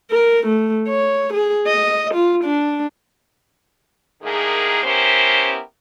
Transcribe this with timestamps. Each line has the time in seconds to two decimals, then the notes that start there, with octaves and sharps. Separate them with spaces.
0.11 A#4
0.47 A3
0.89 C#5
1.33 G#4
1.67 D#5
2.14 F4
2.44 D4
4.22 A2 D#3 A#3 G#4
4.84 B3 C#4 E4 G4 A#4 C5